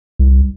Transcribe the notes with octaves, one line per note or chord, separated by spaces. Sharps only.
C2